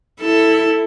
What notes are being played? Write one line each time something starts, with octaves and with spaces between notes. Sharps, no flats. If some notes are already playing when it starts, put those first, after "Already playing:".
E4 A4